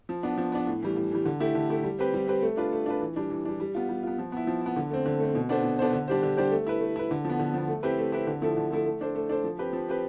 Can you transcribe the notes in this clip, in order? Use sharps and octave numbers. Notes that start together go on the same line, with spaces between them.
F3
B3 D4
F3
B3 D4
A2
E3 G3
A2
E3 G3
D3
A3 E4 G4
D3
A3 E4 G4
G3
C4 G4 B4
G3
C4 G4 B4
A3
D4 F4 B4
A3
D4 F4 B4
E3
G3 D4
E3
G3 D4
G3
B3 F4
G3
B3 F4
F3
B3 E4
F3
B3 E4
D3
A3 C4
D3
A3 C4
B2
B3 D4 A4 C5
B2
B3 D4 A4 C5
D3
G3 D4 G4 C5
D3
G3 D4 G4 C5
A3
E4 B4
A3
E4 B4
D3
F3
B3
D3
F3 B3
A3
C4 E4 G4 B4
A3
C4 E4 G4 B4
D3
F3 A3 E4 A4
D3
F3 A3 E4 A4
A3
D4 A4 C5
A3
D4 A4 C5
F3
C4 G4 B4
F3
C4 G4 B4